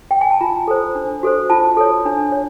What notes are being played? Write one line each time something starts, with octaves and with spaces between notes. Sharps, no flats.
G5
G#5
A5
F4 A#5
A4 C5
D4
F#4 A4 C5
F4 A5
A4 C#5
D4
C#5